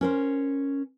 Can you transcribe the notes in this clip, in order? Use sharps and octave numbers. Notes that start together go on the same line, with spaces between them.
C#4 A#4 C5